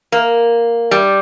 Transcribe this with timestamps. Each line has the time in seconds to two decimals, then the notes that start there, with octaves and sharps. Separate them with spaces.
0.12 A#3
0.91 G3